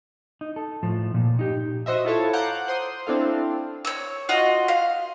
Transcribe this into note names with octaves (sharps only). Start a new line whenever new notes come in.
D#4
A4
A2 F3
A#2
D#4 G4
F#4 C5 D#5 E5
E4 F4 A4 C#5
F5 F#5 A#5 D6 F#6 G6
C5 C6 D#6
C4 D4 E4 A4 F5
C#5 E6
F4 F#4 D#5
F5